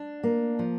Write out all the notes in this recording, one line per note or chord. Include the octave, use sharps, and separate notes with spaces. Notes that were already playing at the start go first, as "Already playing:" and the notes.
Already playing: D4
A#3
F3